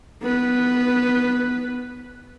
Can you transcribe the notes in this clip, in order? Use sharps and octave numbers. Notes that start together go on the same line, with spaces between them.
B3 B4